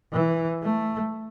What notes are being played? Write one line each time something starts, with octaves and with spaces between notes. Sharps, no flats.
E3
A3